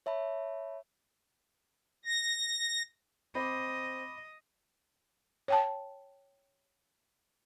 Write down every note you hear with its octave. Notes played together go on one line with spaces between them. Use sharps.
C#5 E5 A5 B5
A#6
C4 D#5 B5 D6
C#5 G5 A5